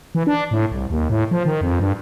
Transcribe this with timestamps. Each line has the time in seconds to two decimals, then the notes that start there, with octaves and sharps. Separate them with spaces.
0.15 E3
0.27 D4
0.51 A2
0.72 C2
0.90 D#2
1.10 A2
1.31 F3
1.45 D#3
1.61 F2
1.80 G2